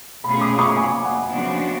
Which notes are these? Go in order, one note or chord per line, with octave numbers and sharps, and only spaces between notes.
B2 A3 C#4 F4 G#4 B5
D6
C#6
G#5
F#5
C#3 F3 B3 D4 F#4